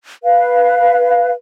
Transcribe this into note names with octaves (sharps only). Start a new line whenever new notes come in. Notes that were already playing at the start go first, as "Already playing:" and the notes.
B4 F5